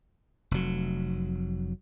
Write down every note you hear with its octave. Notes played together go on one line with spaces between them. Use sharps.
F1 F#3